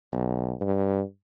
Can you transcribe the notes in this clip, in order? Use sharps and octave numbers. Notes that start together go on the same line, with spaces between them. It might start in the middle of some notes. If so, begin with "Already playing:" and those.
B1
G2